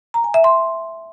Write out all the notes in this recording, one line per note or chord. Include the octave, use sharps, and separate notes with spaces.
A#5
G#5
E5
C6